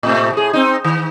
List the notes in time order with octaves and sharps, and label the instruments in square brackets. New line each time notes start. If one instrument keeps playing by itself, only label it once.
[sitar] A2 C3 A3
A2 G#4
C4 D#4
D#3